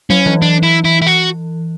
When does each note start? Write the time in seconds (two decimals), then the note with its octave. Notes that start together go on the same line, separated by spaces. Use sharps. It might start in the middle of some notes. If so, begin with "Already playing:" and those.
0.10 F#3 C#4
0.26 E3
0.42 D4
0.63 E4
0.85 E4
1.02 E4
1.07 F#4